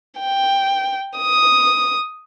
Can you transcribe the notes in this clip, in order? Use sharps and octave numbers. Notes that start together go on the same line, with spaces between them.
G5
D#6